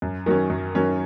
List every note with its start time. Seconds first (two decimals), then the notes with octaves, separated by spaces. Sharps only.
0.02 F#2
0.26 D#3 F#3 C#4
0.50 F#2
0.75 D#3 F#3 C#4